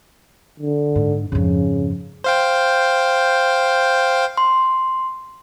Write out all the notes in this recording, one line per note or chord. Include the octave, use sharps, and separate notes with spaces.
D3
G#2
F2 G#2 C#3
C5 F5 G5
C6